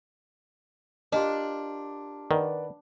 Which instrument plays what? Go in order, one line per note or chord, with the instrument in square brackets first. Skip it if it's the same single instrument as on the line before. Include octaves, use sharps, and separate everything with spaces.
[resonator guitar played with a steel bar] D4 [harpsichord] F4 G4 A#4 [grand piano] D#5
[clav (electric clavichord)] D#3 [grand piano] B4 D5 F#5